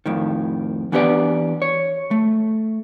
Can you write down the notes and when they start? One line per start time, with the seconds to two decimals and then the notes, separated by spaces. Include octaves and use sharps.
0.06 F2 A2 D#3
0.92 E3 B3 D4 G4 B4 D5
1.62 C#5
2.11 A3